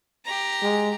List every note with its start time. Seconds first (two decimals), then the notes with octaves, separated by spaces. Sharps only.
0.25 G4 A#5
0.63 G#3